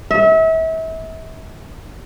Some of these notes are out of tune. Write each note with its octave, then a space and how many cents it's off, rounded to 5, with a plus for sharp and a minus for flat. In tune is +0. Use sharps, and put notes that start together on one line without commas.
E5 -35